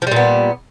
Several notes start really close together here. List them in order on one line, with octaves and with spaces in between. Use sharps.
F3 G3 A#2 B3